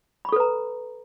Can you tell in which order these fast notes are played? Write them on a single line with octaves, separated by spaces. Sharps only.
B5 C#6 A4 B4 A#5